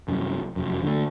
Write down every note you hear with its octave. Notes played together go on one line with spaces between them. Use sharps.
C2 F#2
F1 F#2
D3 A3